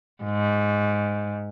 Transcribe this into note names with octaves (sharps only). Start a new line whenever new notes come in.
G#2